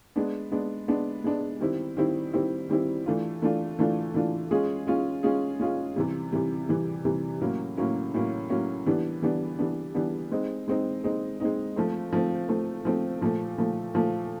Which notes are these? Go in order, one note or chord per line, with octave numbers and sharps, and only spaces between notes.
G#3 B3 D4
G#3 B3 D4
G#3 B3 D4
G#3 B3 D4
D#3 G3 C4 E4
D#3 G3 C4 E4
D#3 G3 C4 E4
D#3 G3 C4 E4
E3 A3 D4 F4
E3 A3 D4 F4
E3 A3 D4 F4
E3 A3 D4 F4
G#3 C#4 F4 G#4
G#3 C#4 F4 G#4
G#3 C#4 F4 G#4
G#3 C#4 F4 G#4
C3 E3 G3
C3 E3 G3
C3 E3 G3
C3 E3 G3
A2 F#3 A#3 C#4
A2 F#3 A#3 C#4
A2 F#3 A#3 C#4
A2 F#3 A#3 C#4
E3 G3 B3 D4
E3 G3 B3 D4
E3 G3 B3 D4
E3 G3 B3 D4
G#3 C4 D#4
G#3 C4 D#4
G#3 C4 D#4
G#3 C4 D#4
F3 A3 C4
F3 A3 C4
F3 A3 C4
F3 A3 C4
A#2 F3 A3
A#2 F3 A3
A#2 F3 A3